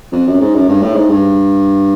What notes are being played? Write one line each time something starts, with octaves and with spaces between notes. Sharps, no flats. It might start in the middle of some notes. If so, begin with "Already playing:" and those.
F2
F#2
G#2
F#2
G2
A2
G#2
G2